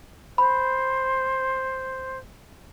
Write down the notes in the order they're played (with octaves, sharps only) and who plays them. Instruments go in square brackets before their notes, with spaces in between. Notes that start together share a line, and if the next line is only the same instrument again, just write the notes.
[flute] C5 [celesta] B5